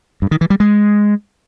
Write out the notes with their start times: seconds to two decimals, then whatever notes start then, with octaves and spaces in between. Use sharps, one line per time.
0.22 G2
0.31 D#3
0.41 E3
0.50 G3
0.60 G#3